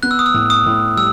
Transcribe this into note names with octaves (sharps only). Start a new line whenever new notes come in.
B3 F#6
E6
D#6
E6
A2
D#6
A2
G3 E6